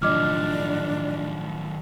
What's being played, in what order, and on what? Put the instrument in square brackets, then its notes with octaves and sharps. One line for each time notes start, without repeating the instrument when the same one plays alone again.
[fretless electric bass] A2 F3 [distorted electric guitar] D#3 F#3 [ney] D4 [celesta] D#5 D6 F6